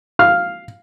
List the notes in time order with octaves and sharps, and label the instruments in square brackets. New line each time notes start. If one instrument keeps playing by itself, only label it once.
[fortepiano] F5 F6